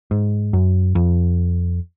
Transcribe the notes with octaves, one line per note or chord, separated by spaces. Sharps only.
G#2
F#2
F2